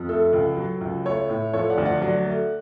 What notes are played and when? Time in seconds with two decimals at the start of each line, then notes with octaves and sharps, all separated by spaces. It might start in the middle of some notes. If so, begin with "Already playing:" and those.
Already playing: F2
0.09 A3 A4
0.33 C#2
0.57 F#3
0.81 C#2
1.05 A3 A4 C#5
1.29 A2
1.53 F3 A4 C#5
1.70 D5 F#5
1.78 D2
1.85 D5 F#5
2.02 F#3 D5 F#5
2.26 A3